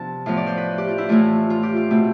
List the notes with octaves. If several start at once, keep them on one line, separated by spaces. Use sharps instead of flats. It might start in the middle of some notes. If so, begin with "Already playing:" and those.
Already playing: C3 F3 B3 D4 A5
A2 F3 B3 F5
D5
C5
B4
G4
F4
E4
A2 E3 A3 F4
F4
G4
F4
B2 A3 C4